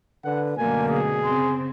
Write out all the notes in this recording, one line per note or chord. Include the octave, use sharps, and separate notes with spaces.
D3 B4 F#5
F#2 B2 D3 A3 A#3 G#5
G#4
C#3 C4 C6